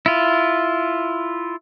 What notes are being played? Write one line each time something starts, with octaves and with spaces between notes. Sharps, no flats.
E4 F4